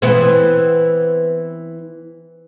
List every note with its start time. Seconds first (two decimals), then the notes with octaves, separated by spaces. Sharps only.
0.02 E3 B3 C4